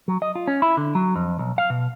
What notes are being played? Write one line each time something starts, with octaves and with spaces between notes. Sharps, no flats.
F#3
D#5
F4
C#4
E4
D3
F#3
F2
B1
F5
B2